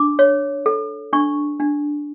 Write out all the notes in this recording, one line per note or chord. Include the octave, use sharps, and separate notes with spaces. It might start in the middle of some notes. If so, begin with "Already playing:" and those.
Already playing: D4 D6
C#5
A4
D4 C#6
D4